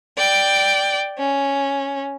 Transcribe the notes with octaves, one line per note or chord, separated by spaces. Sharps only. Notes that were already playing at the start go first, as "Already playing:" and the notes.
D5 G5
C#4